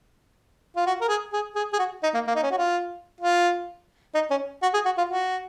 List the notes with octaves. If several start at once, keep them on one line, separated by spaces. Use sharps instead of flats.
F4
F#4
A#4
G#4
G#4
G#4
G#4
F#4
D#4
A#3
A#3
D#4
C#4
F#4
F4
F4
D#4
C#4
F#4
G#4
F#4
F4
F#4